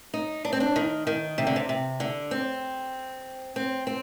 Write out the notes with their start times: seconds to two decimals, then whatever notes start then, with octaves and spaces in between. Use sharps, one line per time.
0.14 D#4
0.45 D4
0.53 C4
0.60 D4
0.76 D#3
1.07 D#3
1.38 C3
1.47 D3
1.56 C3
1.69 C3
2.00 D3
2.31 C4
3.56 C4
3.87 C4